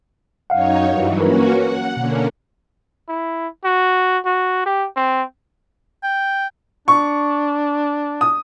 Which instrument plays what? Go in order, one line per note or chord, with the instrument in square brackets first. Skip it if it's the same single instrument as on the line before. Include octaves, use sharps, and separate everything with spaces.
[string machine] F#2 D#4 C#5 [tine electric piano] F5 F#5
[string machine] G2 E3 F#3
[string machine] A#3 C#4 F#4 [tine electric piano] A#4 B4
[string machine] F#5
[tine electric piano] B2 [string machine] D3 A#3 C#4
[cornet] E4
F#4
F#4
G4
C4
[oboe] G5
[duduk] D4 [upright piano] C#6
[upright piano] D#6